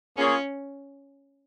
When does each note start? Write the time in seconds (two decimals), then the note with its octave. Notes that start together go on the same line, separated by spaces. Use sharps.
0.17 A#3 C#4 F4 G#4 C#5